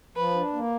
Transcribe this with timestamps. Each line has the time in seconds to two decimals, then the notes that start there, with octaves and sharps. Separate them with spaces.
0.16 F3 B4
0.34 D4
0.54 A#3